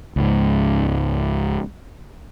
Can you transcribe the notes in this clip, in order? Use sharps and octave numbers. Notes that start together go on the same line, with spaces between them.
C#2 G#2